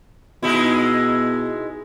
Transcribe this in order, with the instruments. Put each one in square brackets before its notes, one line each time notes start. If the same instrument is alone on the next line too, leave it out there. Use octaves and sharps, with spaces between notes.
[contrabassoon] B2 [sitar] G#3 D#4 E4